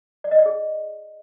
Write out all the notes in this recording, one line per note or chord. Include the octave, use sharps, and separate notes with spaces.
D5
D#5
D5
G#4